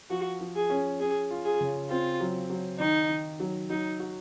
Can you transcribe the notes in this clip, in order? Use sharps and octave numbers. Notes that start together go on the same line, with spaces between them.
F3 F#4
F3
G#4
C#4
C#4 G#4
F4
G#4
C#3
C4 F4
F#3
F#3
D#3 D#4
D#3
F#3
F#3 D#4
F#4